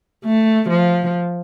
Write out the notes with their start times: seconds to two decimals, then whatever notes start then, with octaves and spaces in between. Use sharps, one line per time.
0.24 A3
0.69 F3